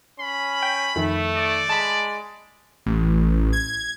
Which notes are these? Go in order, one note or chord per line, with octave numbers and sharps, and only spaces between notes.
C#4 B5
G5
F2 D#3 A3
D5
G#3 A5 B5
A1
G#6